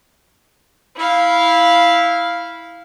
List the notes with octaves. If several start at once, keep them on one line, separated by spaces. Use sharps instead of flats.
E4 F5